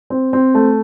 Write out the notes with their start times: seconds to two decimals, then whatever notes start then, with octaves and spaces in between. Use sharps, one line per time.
0.10 C4
0.33 C4
0.55 A3